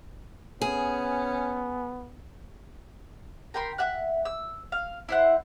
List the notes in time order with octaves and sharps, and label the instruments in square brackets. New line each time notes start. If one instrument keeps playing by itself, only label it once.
[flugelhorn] B3 [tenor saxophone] C#4 [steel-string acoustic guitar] G#4
[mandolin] A#4 G5 B5 C6
E5 F#5 F#6
E6
F5
E4 C5 F#5